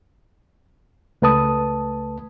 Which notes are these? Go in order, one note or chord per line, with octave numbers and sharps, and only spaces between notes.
C#2 A3 B4 A5 D#6